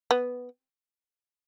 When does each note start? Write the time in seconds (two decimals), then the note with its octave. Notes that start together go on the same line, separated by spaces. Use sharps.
0.11 B3